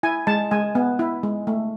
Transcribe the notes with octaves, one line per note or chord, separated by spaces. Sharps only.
E4 G#5
G#3 A5
G#3 G#5
B3
E4
G#3
A3